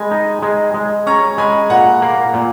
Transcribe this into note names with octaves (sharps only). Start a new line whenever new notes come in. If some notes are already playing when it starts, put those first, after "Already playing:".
Already playing: G#3 A#4 G#5 B5
D#4
G#3
G#3
C#4 A#5 C#6
G#3 G#5 B5
A#2 F#5 A#5
A#3
A#2